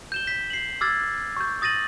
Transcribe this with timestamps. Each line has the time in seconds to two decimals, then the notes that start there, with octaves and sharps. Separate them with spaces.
0.12 G6 E7 G7
0.27 G6 B6
0.50 C7 F#7
0.81 D6 E6 F6 G#6 A6
1.37 C#6 G6
1.62 D#6 A6 A#6 D#7 F#7